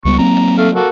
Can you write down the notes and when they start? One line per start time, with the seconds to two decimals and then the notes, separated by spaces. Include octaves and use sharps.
0.05 C#2 G3 B3 C#6
0.19 F#3 A#3 C4 A#5
0.58 A3 F5
0.74 A#3 F#4 A4